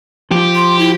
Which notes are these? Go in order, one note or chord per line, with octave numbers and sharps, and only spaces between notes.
F3 G4
C6
E4